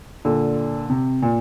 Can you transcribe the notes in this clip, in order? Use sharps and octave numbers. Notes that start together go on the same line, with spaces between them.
A#2 D3
C3
A#2